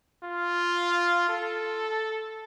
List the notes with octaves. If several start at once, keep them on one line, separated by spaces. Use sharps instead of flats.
F4
A4